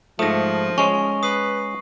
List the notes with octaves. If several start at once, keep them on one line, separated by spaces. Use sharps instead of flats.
G#2 F3 A3 D#6 A#6
G#3 C#4 C#6
B4 D#6 C7